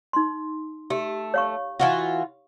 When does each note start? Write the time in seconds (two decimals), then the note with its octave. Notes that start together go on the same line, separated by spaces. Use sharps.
0.13 D#4 C6
0.90 A3 G4
1.34 C#5 F5 C#6
1.80 E3 F4 F#4